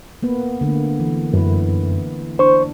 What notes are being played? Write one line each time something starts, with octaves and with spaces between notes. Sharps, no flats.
A#3 B3 B4
D3 A3 A#3
E3
F#2 E4 B4
D4 C5 C#6